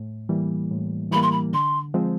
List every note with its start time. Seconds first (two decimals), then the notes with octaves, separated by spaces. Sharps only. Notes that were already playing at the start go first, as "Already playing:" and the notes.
Already playing: A2
0.29 E3 G3 A#3
0.71 A2
1.11 E3 G3 A#3 B5
1.22 C6
1.31 B5
1.53 D3 C6
1.94 F3 G#3 C4